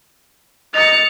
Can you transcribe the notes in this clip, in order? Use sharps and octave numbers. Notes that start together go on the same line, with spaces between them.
D#5 A6 C#7 F7